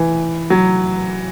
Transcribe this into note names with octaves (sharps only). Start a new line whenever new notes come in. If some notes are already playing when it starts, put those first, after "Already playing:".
Already playing: E3
F#3